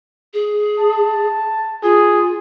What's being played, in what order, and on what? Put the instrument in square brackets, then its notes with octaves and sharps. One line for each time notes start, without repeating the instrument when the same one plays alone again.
[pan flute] G#4
[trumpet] A5
[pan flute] F4 [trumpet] G#4